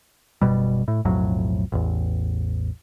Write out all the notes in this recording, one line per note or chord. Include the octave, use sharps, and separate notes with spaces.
F#1 D#2 B2 G3
A2
B1 F2 A2 F#3
A1 E2